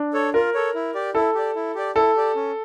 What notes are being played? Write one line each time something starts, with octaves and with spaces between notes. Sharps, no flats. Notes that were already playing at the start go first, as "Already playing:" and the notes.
Already playing: D4
A4 C#5
F4 A#4
A4 C#5
E4
G4 D5
E4 A4
G4 D5
E4
G4 D5
E4 A4
G4 D5
C#4